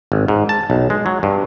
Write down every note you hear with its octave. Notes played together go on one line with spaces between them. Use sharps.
G#1
G#2
A5
B1
G#3
F#3
G2